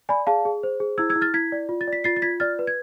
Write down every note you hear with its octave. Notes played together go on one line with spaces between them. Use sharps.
D5 G#5 B5
G#4 F5 A5
G#4
C5
G#4
E4 E6 G#6
E6 G#6
E4
F6 A6
E4 G#6 B6
D5
F4
A6
D5 B6
F4 A6 C7
A6
F4 G#6 B6
D5 F6 A6
B4
G#6